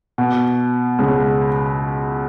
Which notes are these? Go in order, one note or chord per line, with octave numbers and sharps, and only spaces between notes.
B2
C#2 C#3